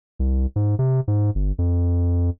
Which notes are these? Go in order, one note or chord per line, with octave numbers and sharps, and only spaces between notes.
C2
G#2
C3
G#2
G1
F2